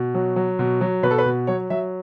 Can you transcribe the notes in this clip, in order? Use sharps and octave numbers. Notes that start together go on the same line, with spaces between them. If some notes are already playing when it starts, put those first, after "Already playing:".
Already playing: B2
F#3
F#3
B2
F#3
B2 B4
A4
B4
B2
F#3 C#5
F#3 E5